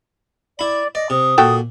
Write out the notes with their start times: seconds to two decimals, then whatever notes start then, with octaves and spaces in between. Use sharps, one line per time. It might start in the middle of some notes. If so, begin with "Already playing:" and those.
0.59 E4 D5 B5
0.95 D5 D#5
1.10 C3 D#6
1.38 A#2 F#4 A4 G5